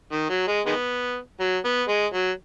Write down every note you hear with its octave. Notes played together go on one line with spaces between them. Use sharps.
D#3
F#3
G#3
D#3 G#3 B3
F#3
B3
G#3
F#3